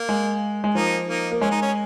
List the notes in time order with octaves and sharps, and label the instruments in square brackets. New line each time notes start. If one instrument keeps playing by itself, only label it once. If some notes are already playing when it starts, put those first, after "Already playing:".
Already playing: [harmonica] A#3
[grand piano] G#3
G#3
[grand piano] F3 [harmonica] A#3 D#4
[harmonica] A#3 D#4
[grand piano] A#3
[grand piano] G#3 [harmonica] C#4
[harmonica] D#4
C#4